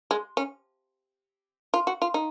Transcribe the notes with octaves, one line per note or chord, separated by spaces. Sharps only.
G#3
C#4
F4
F#4
F4
D#4